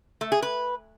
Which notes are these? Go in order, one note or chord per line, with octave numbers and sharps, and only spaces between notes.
A3
G#4
B4